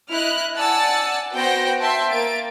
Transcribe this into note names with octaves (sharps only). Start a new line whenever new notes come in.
E4 D#5 F6 F#6
D5 F#5 G#5 A5 E6 A6
B3 F#4 C5 G5 A#6 D7
E5 G5 A5 C6
A#3 A6 D7